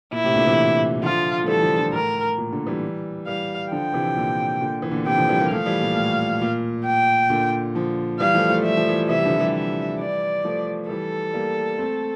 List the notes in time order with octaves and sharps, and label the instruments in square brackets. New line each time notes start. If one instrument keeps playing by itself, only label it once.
[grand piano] A#2 [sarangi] E4
[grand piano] A2 C3
A#2 D3
C3 E3
[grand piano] D3 F3 [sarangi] F4
[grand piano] A3
[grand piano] E3 G3 [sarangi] A4
[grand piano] D3 F3
D3 F3
[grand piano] A2 [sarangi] A#4
[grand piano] A#2
A#2 D3
E3 G3
[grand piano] E3 G3 [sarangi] F5
[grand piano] D3 F3 [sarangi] G5
[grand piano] C3 E3
A#2 D3
A#2 D3
E3
A#2 D3
[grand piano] C3 E3 [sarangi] G5
[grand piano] D3 F3
E3 G3
G3 A#3
[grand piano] F3 A3 [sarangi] F5
[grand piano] E3 G3
A#2
A2
A#2
[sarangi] G5
[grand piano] A#2 D3
D3 F3
[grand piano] E3 G3 [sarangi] F5
[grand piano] F3 A3
F3 A3
[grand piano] G3 [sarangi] E5
[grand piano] F3
E3 G3
[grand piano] C3 E3 [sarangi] E5
[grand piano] G3
D3 F3
F3
E3 G3
[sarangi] E5
D5
[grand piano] F3 A3
[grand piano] E3 G3 [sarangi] A4
[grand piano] G3 A#3
A3 C4